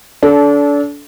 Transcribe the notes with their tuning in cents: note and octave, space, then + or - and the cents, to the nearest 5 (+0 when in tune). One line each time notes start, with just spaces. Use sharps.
D4 -30 A4 -20